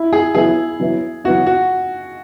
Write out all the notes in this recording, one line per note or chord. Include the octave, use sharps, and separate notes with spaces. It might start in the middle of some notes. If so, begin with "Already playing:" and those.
Already playing: E4
G#4
F#3 B3 E4 G#4
F#3 B3 E4
F#3 B3 E4 F#4
F#4